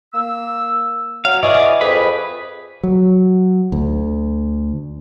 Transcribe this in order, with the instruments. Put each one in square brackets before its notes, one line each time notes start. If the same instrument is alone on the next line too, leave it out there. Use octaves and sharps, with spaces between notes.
[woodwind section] A#3 E6
[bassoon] F#3 [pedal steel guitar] F5
[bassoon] E3 [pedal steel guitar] G#4 D5 [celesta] D#5 C#6
[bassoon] F2 [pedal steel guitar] G#4 B4 B5
[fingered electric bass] F#3
D2